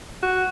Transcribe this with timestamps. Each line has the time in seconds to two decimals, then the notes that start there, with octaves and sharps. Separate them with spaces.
0.22 F#4